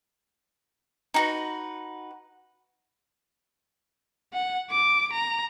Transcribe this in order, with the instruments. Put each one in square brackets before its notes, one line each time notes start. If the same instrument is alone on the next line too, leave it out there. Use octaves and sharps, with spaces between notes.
[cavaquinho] D#4 F#4 B4
[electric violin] F#5
D6
A#5